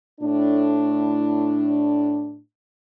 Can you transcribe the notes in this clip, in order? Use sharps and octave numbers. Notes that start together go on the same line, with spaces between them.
A2 D4